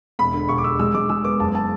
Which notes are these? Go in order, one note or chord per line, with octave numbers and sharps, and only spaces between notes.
E1 B5
D3
E1 C#6
D6
E1 E6
G#3 E6
G#3 D6
G#3 E6
B3 D6
F#1 A5
A5